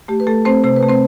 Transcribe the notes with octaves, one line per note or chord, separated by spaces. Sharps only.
A3 G4
B4
A3 A4
A3 C4 C5
C3 C5
B4
A3
C4 C5